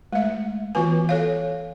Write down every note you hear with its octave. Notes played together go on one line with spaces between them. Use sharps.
G#3 A3 E5
E3 B3 F4 F#4 B4 G#5
A4 C#5 F5